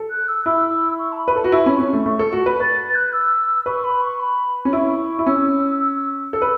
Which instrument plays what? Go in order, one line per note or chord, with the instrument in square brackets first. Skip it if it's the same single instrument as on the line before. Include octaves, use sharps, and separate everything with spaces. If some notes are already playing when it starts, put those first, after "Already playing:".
Already playing: [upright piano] A4
[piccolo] F#6
E6
[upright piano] E4 [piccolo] E6
[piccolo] C#6
A5
B5
[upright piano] B4
[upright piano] A4 [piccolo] A5
[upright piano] F#4
[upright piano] E4 [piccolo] C#6
[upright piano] C#4 [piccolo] B5
[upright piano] C#4 [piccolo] C#6
[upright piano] A3
[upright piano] A3 [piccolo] C#6
[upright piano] A4
F#4
B4
[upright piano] B4 [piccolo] A6
[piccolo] A6
F#6
E6
[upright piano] B4 [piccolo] C#6
[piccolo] B5
C#6
B5
[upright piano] C#4 [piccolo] B5
[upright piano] E4 [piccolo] C#6
[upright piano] E4
[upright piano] C#4 [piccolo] E6
[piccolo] E6
[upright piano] A4 [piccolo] E6
[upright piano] B4